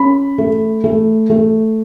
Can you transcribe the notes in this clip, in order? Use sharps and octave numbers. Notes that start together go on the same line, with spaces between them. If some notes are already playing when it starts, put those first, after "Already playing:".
Already playing: C#4 B5
A3
A3
A3